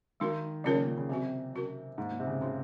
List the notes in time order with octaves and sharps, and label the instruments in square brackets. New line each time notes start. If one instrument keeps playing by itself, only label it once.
[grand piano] D#3 [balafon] G#3 D#4 F#4 A#4
[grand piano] C#3 [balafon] F#3 C#4 F4 A#4 C#5
[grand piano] A#2
A#2
C#3
[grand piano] C3 [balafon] F#3 C4 F#4
[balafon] F#3 C#4 F#4 A#4
[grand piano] G#2 [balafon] D#3 A#3 D#4
[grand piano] A#2
C3
C#3
[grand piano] C#3 [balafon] G#3 D#4 F#4 C5